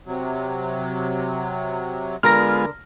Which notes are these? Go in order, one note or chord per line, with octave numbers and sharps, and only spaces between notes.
C3 F#3
D3 G#3 B3 F4 A#4 F6 A#6